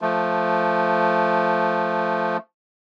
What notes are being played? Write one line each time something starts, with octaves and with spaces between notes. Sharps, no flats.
F3 A3